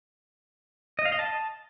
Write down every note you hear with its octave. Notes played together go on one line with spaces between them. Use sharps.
D#5
F5
D#5
A5